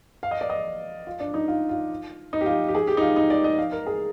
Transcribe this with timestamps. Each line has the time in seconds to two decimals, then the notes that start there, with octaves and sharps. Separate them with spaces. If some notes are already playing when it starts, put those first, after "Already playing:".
0.23 F5
0.31 D#5
0.41 D5
0.49 D#5
1.07 F4
1.20 D4
1.34 D#4
1.48 F4
1.69 F4
2.33 D#4
2.41 G4
2.46 F4
2.68 G4
2.75 G#4
2.88 G4
2.97 D#4
3.02 F4
3.16 D#4
3.30 D5
3.44 D#5
3.58 F5
3.72 A#4
3.87 G#4